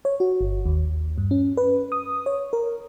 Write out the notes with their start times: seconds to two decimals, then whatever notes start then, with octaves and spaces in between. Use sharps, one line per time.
0.05 C#5
0.20 F#4
0.41 G1
0.66 D#2
1.18 G2
1.31 C#4
1.57 B4
1.92 D#6
2.26 C#5
2.53 A#4